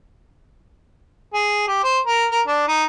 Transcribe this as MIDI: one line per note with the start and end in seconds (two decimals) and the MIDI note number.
1.34 1.65 68
1.68 1.81 67
1.83 1.99 72
2.06 2.26 70
2.31 2.41 70
2.47 2.64 62
2.68 2.84 63